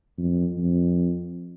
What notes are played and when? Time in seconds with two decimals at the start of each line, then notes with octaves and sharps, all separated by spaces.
0.18 F2
0.57 F2